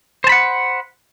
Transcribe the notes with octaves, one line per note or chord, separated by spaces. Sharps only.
C5 F#5 A5 B5